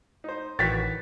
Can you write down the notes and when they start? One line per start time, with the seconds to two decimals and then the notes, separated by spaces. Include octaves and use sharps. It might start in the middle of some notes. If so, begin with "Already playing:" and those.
0.24 D#4 C5
0.59 A1 D#3 E3 F#4 C#5 G5 A6 B6